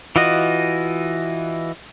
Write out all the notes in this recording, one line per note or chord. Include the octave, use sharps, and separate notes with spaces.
E3 F4 F#4 D#5